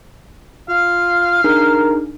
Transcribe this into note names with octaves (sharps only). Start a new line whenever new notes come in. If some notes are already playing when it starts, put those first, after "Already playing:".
F4 F5
D4 D#4 G#4 A#4